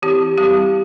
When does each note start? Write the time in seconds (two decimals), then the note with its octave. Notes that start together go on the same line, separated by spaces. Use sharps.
0.02 E3 C4 E4 G4
0.38 G3 C4 E4 G4